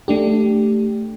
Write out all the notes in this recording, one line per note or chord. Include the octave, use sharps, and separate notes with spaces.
A3 D4 G4